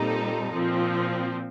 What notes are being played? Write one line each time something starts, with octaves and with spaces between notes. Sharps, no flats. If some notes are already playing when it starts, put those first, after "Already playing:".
Already playing: A#2 G3 C4 D#4 A4
A#2 F3 C4